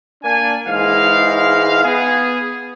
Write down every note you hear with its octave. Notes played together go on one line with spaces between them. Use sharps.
A#3 D4 G#5
G#2 E3 G#3 F5
B3 G#4